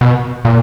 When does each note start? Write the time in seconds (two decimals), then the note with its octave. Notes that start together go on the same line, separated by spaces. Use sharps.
0.01 B2
0.45 A#2